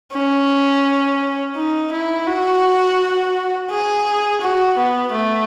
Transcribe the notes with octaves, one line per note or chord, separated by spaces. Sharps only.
C#4
D#4
E4
F#4
G#4
F#4
B3
A3